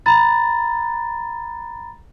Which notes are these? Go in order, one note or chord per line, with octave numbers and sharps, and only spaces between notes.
A#5 B5 A6